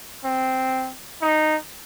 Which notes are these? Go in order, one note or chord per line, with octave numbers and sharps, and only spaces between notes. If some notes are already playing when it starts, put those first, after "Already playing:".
C4
D#4